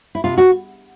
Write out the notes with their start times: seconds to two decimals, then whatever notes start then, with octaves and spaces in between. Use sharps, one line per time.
0.15 E4
0.24 C3 F4
0.38 F#4